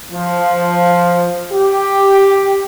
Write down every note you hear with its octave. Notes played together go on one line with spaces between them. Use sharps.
F3
G4